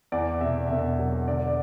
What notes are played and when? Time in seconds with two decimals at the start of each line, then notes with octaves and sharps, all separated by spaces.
0.12 E2 D5
0.41 B2 E5
0.54 D5
0.67 E1 E5
0.99 F#3
1.27 D3 D5
1.48 D5